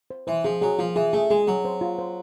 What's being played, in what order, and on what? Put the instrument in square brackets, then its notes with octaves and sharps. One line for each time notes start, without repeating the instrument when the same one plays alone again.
[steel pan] C5
[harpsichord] E3 [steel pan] C5
[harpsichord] F3 [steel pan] G#4
[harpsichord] F#3 [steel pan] G#4
[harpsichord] F3 [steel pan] F4
[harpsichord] E3 [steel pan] G#4
[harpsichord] A3 [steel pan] G#4
[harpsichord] G#3 [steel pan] G#4
[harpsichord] F#3 [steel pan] G#4
[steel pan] C5
F4
C5